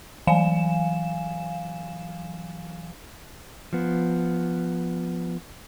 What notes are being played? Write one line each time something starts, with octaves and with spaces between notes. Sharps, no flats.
E3 F#3 F5 G#5 E7
F3 B3